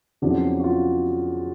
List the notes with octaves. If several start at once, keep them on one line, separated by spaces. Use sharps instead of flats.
F2 C#3 F#3 B3 D4 E4
F#4
F4